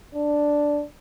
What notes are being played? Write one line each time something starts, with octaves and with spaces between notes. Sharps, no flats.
D4